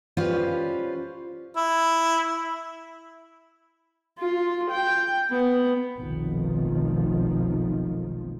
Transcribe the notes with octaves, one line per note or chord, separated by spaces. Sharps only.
C#4 F4 G4 B4 C5 D5
E4
F4
G5
B3
F1 B1 B2 D#3 F3